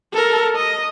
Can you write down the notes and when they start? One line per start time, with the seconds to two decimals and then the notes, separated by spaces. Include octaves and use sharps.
0.13 A4 A#4
0.56 D#5